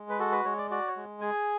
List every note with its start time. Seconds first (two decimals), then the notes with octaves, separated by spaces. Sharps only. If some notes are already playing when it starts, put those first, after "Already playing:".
Already playing: G#3
0.09 B4
0.19 F#4 A4
0.32 B4
0.45 G#3 C#5
0.58 D5
0.71 F#4 D5
0.87 C#5
0.97 G#3
1.21 G#4 G#5